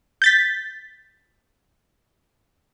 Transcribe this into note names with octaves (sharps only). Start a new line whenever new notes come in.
G6 A6 B6